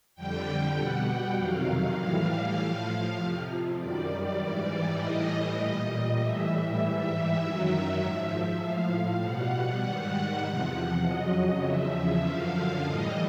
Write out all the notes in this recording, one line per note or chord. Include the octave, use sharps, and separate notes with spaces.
F2 D3 G3 G5
B2 G3 F#5
G5
F2 C3 D#3 F#3 F5
A2 E3 G3
A2 F3
F2 C3 F3
F#2 D#3 G3 D5
G#2 E3 G3 D5
A2 E3 G3 D#5
A#2 G3
A2 E3 G3 E5
G#2 E3 G3
F#2 D#3 F#3 E5
G#2 F3
A2 F3 F5
B2 G3 F#5
G#2 D#3 G3
E2 C3 F3 F#5
F2 C#3 F#3 D#5
E2 C#3 F3 E5
F#2 D3 F3 F5
A2 E3 G3 D#5